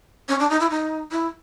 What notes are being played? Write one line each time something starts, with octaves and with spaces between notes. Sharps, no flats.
C#4
D4
D#4
E4
D#4
E4